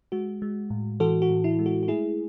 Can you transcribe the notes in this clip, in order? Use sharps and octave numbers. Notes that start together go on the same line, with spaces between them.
G#3 F#4
G#3
A2
E3 F#4 A4
F#4
A2
E4
G#3
F#4
F#4
A3 E4 G#4